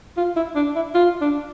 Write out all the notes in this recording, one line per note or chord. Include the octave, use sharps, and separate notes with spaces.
F4
E4
D4
E4
F4
D4